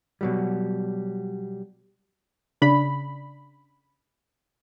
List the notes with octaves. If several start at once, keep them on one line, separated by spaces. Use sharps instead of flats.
B2 F#3 G3
C#3 D4 B5